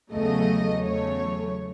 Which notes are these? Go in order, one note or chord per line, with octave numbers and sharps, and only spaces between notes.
E2 C#3 F#3 A3 D#5
E2 C#3 F#3 A3 C#5